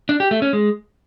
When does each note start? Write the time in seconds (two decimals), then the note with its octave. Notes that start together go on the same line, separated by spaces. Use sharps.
0.09 D4
0.20 G4
0.31 A3
0.42 C#4
0.53 G#3